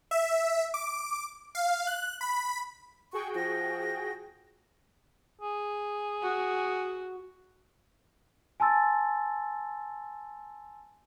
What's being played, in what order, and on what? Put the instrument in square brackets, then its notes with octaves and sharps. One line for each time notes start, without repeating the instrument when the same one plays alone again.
[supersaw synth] E5
D6
F5
F#6
B5
[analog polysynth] F#4 G#4 G5 [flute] C#6
[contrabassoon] F3 [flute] A#6
[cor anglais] G#4
[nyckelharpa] F#4
[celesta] G#5 A5 C6 E6 A6